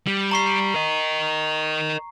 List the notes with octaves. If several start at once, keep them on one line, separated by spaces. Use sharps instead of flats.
G3
A#5 C#6 C7
A#4 D#5